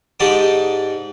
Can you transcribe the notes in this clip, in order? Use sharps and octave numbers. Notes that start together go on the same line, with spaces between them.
G#2 D#4 G4 D5 A5 D#6